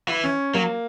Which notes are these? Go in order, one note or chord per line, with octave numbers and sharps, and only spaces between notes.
E3
C#4
F#3 A#3